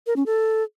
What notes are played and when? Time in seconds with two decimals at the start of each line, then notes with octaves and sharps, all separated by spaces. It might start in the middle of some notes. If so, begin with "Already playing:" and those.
0.07 A#4
0.16 C#4
0.26 A4